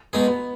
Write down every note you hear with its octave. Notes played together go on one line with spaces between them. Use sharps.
B2 G#3 B3 D#4 G#4
B3